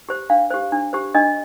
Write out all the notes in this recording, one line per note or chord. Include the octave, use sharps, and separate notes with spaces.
G4 C5
D4 F5
G4 C5
D4
G4 C5
D4 D#5